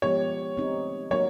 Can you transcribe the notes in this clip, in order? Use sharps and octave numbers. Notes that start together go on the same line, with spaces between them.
F3 G#3 B3 D#4 G4 C#5
A3 C4 D#4 G4
F#3 A#3 D4 F#4 A#4 C#5